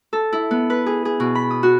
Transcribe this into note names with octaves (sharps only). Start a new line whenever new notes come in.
A4
E4
B3
B4
G#4
G#4
B2
B5
D#6
F#4